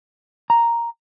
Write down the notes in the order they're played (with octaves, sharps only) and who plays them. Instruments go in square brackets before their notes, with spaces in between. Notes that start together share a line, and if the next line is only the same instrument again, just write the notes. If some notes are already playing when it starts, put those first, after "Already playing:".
[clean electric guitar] A#5